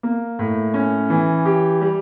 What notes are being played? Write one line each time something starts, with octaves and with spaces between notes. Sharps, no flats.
A#3
A2
C#4
E3
G4
G3